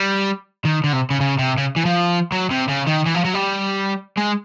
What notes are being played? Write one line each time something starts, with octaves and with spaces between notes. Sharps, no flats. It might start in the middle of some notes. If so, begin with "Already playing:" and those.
Already playing: G3
D#3
D3
C3
C#3
C#3
C3
C#3
E3
F3
F#3
C3
C#3
D#3
E3
F3
F#3
G3
G#3